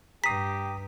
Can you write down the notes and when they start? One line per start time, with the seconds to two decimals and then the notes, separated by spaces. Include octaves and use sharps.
0.24 G2 G4 A#5 D#6 B6 C7